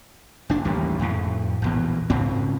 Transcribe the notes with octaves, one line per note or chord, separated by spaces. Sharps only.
F#1 D4
A1 D#2 G3
F2 A2
A#1 E2 B2
G#2 C#3 C4